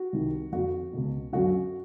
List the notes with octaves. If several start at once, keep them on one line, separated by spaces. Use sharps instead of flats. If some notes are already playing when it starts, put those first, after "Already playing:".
Already playing: F#4
C2 C3 D#3
F2 D3 F#4
C#2 B2
F#2 D3 F#4